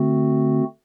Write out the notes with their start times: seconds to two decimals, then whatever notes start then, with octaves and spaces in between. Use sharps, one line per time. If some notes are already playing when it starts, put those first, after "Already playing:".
Already playing: D3 A3 C4 F#4